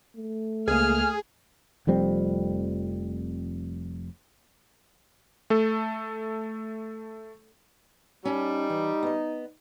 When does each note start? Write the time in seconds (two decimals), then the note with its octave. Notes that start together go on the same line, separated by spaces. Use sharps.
0.17 A3
0.68 C#2 A#3 G#4 F6
1.87 F1 F2 G3 C4
5.50 A3 A4
8.25 G3 C#4 D#4 A5
8.70 E3
9.03 B3 D#5